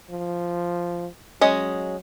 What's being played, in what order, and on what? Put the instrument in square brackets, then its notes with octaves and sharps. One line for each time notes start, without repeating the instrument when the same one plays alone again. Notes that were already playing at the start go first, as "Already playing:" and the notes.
[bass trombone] F3
[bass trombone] F#3 [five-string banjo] G#3 C#4 D#5